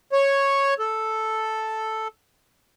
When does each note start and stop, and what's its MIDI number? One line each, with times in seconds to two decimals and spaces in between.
0.12 0.74 73
0.79 2.08 69